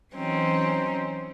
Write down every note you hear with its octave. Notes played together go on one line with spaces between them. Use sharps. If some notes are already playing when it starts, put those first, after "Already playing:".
E3 F#3 C4 C#4 D#4